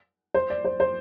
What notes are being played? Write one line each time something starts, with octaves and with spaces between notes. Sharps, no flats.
C5
D5
C5
C5